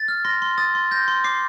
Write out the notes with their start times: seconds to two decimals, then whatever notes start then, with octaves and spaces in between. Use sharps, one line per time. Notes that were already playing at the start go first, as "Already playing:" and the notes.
Already playing: A6
0.08 F6
0.25 C6 A#6
0.42 C6
0.58 D#6 A6
0.75 C6
0.91 G6 A#6
1.08 C6
1.24 D6 C7